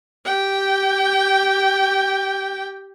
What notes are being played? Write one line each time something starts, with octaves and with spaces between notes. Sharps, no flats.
G4 G5